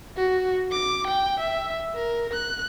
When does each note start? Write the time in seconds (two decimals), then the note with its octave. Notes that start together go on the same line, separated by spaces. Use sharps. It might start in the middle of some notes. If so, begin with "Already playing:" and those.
0.17 F#4
0.72 D6
1.07 G5
1.40 E5
1.96 A#4
2.33 F#6